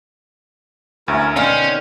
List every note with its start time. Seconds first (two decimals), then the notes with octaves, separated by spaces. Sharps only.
1.08 D2 C#4 E4 A#4
1.36 B2 D3 D#3 C#4 F5 C6 F6